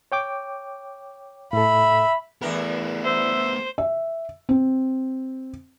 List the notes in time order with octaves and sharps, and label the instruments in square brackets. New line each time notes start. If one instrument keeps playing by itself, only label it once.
[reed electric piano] C#5 G5 D6
[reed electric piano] A2 A4 [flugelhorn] E5 [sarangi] B5
[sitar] E2 E3 A#4 [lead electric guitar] A3 B3
[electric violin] C5 [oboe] E5
[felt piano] E5
C4